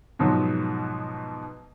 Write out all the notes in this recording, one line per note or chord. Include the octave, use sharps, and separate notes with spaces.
G#2 B2 F3 F#3